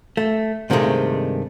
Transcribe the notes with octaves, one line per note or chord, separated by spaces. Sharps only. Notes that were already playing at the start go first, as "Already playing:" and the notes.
A3
G2 C3 D#3 F3 G#3 A3